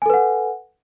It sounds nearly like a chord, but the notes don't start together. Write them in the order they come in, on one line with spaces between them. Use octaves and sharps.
G#5 A4 B4 F#5